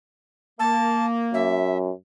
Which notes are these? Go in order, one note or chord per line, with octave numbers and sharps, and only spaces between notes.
A#3 A5
F#2 E5